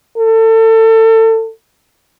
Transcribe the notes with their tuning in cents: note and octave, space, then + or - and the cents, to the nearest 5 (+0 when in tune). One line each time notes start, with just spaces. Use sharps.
A4 +30